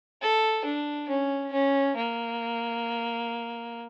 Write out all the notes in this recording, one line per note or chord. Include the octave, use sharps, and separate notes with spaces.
A4
D4
C#4
C#4
A#3